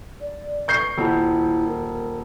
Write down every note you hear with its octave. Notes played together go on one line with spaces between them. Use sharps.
D5
C#6 G6 C7
D#1 E4
A#4